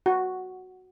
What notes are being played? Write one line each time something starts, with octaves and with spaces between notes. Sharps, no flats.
F#4